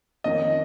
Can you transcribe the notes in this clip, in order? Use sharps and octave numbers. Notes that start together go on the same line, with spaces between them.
F2 D#3 A#3 C#4 D#5